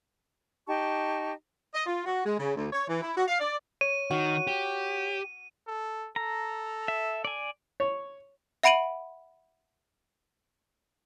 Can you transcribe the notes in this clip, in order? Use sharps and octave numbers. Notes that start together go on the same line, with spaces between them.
D#4 G4 A5 C#6
D#5
F4
F#4
G#3
C#3
D2
C#5
E3
E4
F#4
F5
D5
C#5 D#7
D#3 F#4
G4
A4
A4 A#5
E5
D5 G#5
C#5
E5 F#5 B5 D7 D#7 F#7